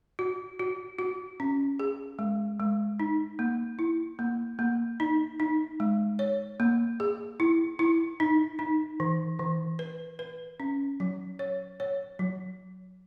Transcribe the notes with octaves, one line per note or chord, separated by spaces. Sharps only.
F#4
F#4
F#4
C#4
G#4
G#3
G#3
D#4
A#3
E4
A#3
A#3
D#4
D#4
G#3
C#5
A#3
G#4
E4
E4
D#4
D#4
E3
E3
B4
B4
C#4
F#3
C#5
C#5
F#3